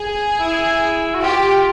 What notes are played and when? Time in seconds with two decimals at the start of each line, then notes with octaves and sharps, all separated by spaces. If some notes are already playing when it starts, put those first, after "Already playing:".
Already playing: G#4
0.39 E4
1.15 F#4
1.23 F4 G4